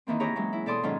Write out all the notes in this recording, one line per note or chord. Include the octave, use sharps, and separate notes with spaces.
D#3 E3 A#3 C4
E4 G4 G#4 C#5 A#5
E3 F#3 G#3 A#3 C#4
E4
B2 A4 D5 C6 D#6
G#2 D#3 F#3 C#4 F4 G#4